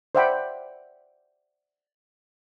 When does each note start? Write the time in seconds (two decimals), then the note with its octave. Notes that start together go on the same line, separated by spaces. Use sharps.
0.15 C5 D5 E5 F#5 G5 B5